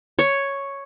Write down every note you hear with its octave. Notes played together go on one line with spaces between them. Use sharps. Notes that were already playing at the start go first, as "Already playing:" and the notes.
C#5